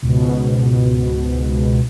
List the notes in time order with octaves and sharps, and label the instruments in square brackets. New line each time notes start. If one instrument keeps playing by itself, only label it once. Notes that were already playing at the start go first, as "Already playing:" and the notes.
[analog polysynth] C#2 G#2 B2